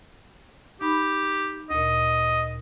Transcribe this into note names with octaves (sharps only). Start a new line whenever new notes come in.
D#4 G4 B5
D2 A#2 D#5